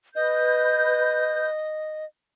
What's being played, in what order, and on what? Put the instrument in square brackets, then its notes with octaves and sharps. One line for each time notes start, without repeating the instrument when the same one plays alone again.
[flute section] B4 G6 [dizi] D#5